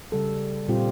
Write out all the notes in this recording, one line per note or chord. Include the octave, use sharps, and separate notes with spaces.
C#3 G3 A4
A#2 G3 C4 F4 G4